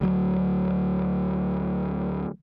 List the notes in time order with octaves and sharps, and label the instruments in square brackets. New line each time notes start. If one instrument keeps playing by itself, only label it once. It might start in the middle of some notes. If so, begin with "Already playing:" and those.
[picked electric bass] D2 F#3